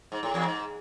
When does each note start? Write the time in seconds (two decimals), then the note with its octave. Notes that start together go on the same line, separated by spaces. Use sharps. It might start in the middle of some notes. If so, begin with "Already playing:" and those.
0.12 G#2
0.23 A2
0.34 E2
0.45 G#2